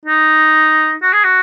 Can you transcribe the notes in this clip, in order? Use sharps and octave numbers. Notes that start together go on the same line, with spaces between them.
D#4
F#4
G#4
F#4